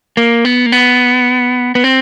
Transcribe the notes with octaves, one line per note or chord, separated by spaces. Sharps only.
A#3
B3
A#3
B3
B3
C4